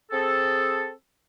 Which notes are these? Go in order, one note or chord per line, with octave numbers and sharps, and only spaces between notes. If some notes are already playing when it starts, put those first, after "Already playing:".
C4 G#4 A4